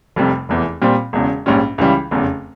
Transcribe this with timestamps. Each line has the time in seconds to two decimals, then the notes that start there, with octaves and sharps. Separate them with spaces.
0.16 F1 F2 C3 G3
0.49 F1 E2 E3
0.82 A#2 G3 C4
1.13 E1 E2 C#3
1.46 A#1 G#2 G3 C#4
1.78 C#2 C#3 E3 G3
2.11 F1 E2 C#3